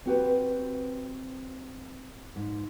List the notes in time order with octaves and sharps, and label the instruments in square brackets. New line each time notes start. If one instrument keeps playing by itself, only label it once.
[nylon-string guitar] C4 F#4 G4 B4
G#2